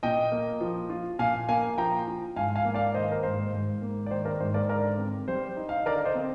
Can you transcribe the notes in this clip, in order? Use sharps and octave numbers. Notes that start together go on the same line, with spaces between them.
A#2 D#5 G5
A#3
F3
F4
A#2 F5 G#5
A#3 F5 G#5
F3 G5 A#5
F4
G#2 F5 G#5
F5 G#5
A#3
D5 F5
D#3 C5 D#5
A#4
G#2 C5
G#2
A#3
D5
D#3 C5
A#4 D5
G#2 C5
A#4 D5
D3 A#4 D5
C4
G3 C5
D#4
F5
D#5
D3 A#4 D5
C5 D#5
C4